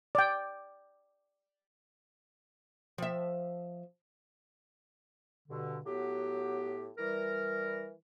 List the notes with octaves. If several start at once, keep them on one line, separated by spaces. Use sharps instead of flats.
D5 G5
F3 E5
G2 B2 D3
A2 F#3 B3 G4
E3 G3 A#4